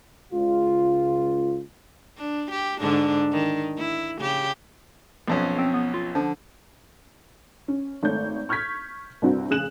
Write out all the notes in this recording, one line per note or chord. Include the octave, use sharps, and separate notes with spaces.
C#2 F4
D4
G4
G#2 D3 D4
D#3
E4
C#3 G4
B1 F2 C#4
C4
B3
F4
D3 F3
C#4
G#1 A3 C#5 G6
C#6 F6 G6 G#6 B6
C2 G2 C4 F#4
F1 C#3 G#4 F#6 E7 F#7